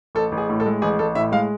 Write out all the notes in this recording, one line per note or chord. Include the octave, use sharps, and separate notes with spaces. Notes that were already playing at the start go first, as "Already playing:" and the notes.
A1 A4
A1
G#4
A2
A4
G#3
A1 G#4
A1 A4
A2 E5
G#3 F5